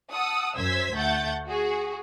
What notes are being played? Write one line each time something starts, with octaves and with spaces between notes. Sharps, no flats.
F#5 A5 D#6 E6
F#2 C5 E6 G#6 B6
D2 A3 F#5 G6 A6
F#4 G#4